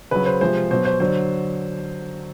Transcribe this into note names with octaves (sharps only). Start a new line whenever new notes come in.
C#3 F#3 B4
C5
C3 F3 G#3 C5
B2 F#3 C5
C5
D3 F#3 C5